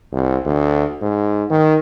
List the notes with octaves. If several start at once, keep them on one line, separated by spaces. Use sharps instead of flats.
C2
D2
G#2
D#3